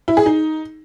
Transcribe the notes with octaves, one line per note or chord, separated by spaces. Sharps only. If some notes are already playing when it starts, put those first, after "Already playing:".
E4
G#4
D#4